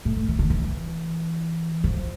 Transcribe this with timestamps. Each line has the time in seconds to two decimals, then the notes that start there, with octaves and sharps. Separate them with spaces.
0.05 A2
0.16 E3
0.29 E3
0.39 D3
0.50 E3
1.84 F3